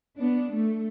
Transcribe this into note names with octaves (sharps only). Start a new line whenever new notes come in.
B3 D4
A3